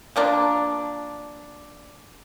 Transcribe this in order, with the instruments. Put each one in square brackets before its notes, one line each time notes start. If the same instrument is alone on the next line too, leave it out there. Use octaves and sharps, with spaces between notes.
[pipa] F3 A#3 D4